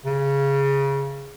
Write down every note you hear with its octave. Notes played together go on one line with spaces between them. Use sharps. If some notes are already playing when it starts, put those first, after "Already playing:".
C#3